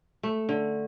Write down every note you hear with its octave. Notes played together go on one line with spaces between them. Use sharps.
A3
D3